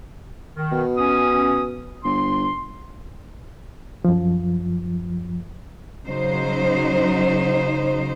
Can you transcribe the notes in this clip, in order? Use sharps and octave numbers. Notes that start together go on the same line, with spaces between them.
D#3
B2
C#4 D#6
G1 C6
F#2 F3
C#3 F#3 D#4 C5